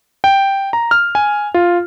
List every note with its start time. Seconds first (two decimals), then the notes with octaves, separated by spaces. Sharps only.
0.24 G5
0.73 A#5
0.91 F6
1.15 G#5
1.54 F4